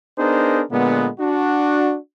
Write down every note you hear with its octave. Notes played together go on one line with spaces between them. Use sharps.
B3 D4 D#4 G#4 A#4 C5
A#2 D3 G#3 B3
D4 F#4